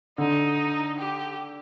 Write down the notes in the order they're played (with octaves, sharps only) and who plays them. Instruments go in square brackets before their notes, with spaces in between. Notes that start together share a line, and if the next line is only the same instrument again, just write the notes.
[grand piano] D3 [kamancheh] D#4
[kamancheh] G4